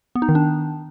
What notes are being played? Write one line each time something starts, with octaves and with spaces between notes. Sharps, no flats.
B3
D#4
D#3
D4